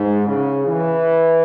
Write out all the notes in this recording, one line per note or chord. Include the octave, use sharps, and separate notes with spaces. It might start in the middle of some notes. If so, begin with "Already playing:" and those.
Already playing: G#2
C#3
E3